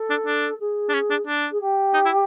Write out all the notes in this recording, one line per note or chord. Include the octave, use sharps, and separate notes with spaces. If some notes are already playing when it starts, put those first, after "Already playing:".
Already playing: A4
D4
D4
G#4
D4
C#4
D4
D4
G#4
G4
D#4
E4